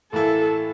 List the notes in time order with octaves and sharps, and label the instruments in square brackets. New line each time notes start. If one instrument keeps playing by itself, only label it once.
[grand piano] A2 E3 A#3 E4 [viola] A4